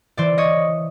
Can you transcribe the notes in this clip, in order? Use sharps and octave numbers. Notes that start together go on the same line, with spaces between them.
E3 C5 D5
C#5 D#5